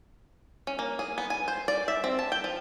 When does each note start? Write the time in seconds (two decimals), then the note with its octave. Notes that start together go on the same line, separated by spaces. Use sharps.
0.67 C#4
0.79 A#3
0.99 G#4
1.18 B3
1.30 G#5
1.48 C5
1.68 D5
1.88 E5
2.04 C4
2.19 A5
2.32 G5
2.44 F3